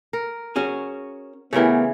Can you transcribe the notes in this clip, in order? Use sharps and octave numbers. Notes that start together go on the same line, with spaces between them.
A#4
C#4 F#4 G#4
C#3 E3 A3 B3 G4 A#4